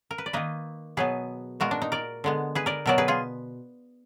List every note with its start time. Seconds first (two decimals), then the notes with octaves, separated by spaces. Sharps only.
0.11 A#4
0.18 B4
0.26 D5
0.33 D#3 A#3 B4 D#5
0.97 B2 F#3 B3 G#4 B4
1.60 A#2 G#3 B3 F#4 A#4
1.71 D4
1.82 D#4
1.92 A#4 D5
2.24 D3 G#3 B3
2.55 G#4 B4
2.66 A#4 D5
2.86 B2 F#3 B3 A#4 D5
2.98 G#4 B4
3.08 F4 G#4